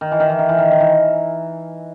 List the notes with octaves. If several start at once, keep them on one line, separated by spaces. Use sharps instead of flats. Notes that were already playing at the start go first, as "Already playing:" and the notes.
D#3
E3
D#3
E3
D#3
E3
D#3
D#3
E3